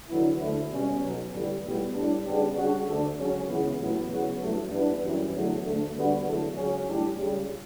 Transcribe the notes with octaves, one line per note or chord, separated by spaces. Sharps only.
E2 D3 F#3 B3 E4
D2 D3 A3 E4
B2 G3 C#4
B1 B2 F#3
A1 G2 D3 G3
B1 A2 G3 B3
A2 G3 D4
C#3 G3 B3 D4 G4
C#3 G3 D4 F#4
D2 D3 A3 D4 A4
C#2 C#3 F#3 C#4
C#2 C#3 E3 B3
A1 A2 F#3 B3
E2 C#3 F#3 B3 F#4
A1 G2 F#3 A3
G2 E3 B3 D4
F#2 E3 G3
E2 D3 F#3 A3
D2 D3 A3
D3 G3 B3 F#4
E2 D3 F#3 A3
C#2 C#3 F#3 C#4
A1 A2 G3 D4 G4
C#2 C#3 G3